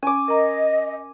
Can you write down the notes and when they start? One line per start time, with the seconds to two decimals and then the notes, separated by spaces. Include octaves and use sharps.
0.03 C#4 G#5 D6
0.28 A#4 D#5 A#5